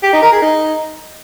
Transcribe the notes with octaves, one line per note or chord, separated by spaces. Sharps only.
G4
D#4
A#4
G#4
D#4